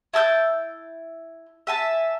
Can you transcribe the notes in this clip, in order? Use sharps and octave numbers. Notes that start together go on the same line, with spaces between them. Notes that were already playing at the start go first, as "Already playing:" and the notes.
E4 A5 E6 G6
E5 G#5 A5